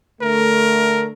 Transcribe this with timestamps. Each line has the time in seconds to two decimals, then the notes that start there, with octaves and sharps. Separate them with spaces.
0.22 D3 A3 A#4